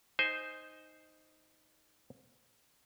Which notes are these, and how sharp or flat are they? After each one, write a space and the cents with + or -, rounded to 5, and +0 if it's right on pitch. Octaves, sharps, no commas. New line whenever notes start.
D#4 +0 C5 +0 G#5 +0